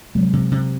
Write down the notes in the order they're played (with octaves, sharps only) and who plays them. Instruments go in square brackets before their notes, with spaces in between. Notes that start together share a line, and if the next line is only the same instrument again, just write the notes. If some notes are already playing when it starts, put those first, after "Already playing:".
[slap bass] C3 [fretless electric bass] F#3 G#3
[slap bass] C3
C3